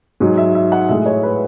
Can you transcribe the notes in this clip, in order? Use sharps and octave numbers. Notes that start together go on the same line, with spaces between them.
G#2 F#3
E5
E5
F#5
A2 G#3 E5
C#5
B4